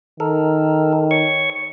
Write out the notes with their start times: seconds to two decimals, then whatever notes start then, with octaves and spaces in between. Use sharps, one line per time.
0.20 D#3 A4 A#4
1.11 C#5 C#6